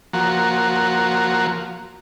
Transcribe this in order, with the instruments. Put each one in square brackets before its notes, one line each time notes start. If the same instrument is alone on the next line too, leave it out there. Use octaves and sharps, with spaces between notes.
[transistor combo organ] F3 A#3 F#4